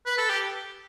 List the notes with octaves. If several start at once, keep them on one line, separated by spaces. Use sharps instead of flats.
B4
A4
G4